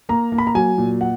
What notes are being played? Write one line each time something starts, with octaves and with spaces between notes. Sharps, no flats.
A#3 A#5
A#3
B5
A#5
F#3 G#5
A#2
F#5